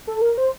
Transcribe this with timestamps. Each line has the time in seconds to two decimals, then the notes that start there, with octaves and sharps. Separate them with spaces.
0.07 A4
0.21 A#4
0.38 C5